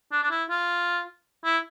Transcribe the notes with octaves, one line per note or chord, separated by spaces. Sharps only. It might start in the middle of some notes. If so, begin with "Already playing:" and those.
D4
D4
E4
F4
E4